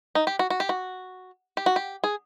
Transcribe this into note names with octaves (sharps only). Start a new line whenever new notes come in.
D#4
G4
F#4
F#4
G4
F#4
G4
F#4
G4
G#4